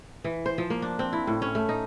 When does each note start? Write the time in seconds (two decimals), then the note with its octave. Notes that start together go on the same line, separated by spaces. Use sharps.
0.24 E3
0.46 C5
0.58 F3
0.70 A#3
0.82 D4
0.99 C4
1.13 E4
1.27 A2
1.42 C#4
1.55 A3
1.69 D#4